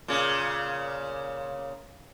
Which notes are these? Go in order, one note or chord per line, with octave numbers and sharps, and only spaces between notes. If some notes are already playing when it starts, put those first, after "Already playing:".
A#2 C#3